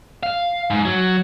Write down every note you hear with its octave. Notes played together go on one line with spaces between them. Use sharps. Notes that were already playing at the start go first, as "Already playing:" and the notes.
F5
G#2
F#3